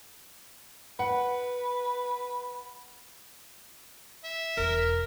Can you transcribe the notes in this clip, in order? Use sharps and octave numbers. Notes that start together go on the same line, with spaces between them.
B4 F#5
E5
E1 E2 A#4